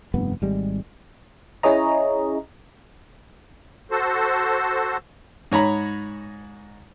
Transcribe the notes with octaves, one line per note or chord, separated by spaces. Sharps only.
F1 G2 B3
G#1 G3 G#3
C#4 E4 G#4 C#5 D#5 A#5
F#4 A4 C5
G#2 C#5 A#5 B5